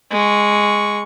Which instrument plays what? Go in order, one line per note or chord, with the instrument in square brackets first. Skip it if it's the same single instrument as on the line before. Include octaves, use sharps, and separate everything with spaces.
[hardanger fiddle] G#3 C#6